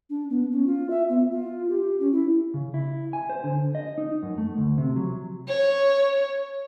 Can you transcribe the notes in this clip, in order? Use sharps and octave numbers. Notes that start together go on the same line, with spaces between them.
D4
B3
C#4
F4
E5
B3
F4
G4
C#4
E4
C#3
E4
G#5
C5
D3
D#5
D#4
F#2
A3
D2
C3
F#3
C#5